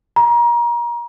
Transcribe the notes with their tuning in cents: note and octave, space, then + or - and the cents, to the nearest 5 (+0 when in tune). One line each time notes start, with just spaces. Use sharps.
A#5 +30